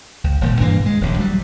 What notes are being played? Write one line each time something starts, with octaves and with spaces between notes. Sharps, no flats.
C#2
D#1 D2 A#2
G2 D3 E3 A#3
G#3
D#1 A#1 D#2
F#3 G3